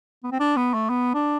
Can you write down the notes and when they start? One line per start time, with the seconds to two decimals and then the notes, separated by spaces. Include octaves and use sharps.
0.24 B3
0.32 C4
0.40 D4
0.57 B3
0.74 A3
0.90 B3
1.15 D4